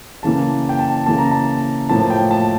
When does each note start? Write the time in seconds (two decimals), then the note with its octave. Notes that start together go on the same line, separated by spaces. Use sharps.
0.23 C#3 E3 A#3 A5
0.69 G5
0.79 A5
1.06 C#3 E3 A#3 A5
1.18 A#5
1.31 A5
1.89 A2 F3 A#3 A5
2.02 A5
2.10 G5
2.31 A5